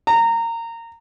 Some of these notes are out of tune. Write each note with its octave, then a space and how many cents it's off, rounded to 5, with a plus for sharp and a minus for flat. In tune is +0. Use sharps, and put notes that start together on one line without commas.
A#5 -20